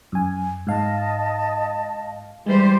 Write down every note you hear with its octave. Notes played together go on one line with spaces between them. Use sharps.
F#2 G#5
G#2 D#5 F5 A5
E3 G3 G#3 C5